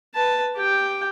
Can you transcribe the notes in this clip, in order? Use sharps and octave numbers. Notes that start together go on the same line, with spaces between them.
B4 A5
G4 G5